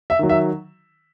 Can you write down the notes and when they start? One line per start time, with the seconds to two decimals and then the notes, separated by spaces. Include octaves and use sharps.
0.10 E5
0.19 D#3 F#3
0.29 E5